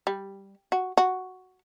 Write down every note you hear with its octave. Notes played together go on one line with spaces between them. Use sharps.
G3
F#4
F#4